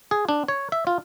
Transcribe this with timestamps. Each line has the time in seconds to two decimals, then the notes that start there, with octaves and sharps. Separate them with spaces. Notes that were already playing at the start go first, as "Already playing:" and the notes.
0.11 G#4
0.29 D4
0.48 C#5
0.72 E5
0.87 F4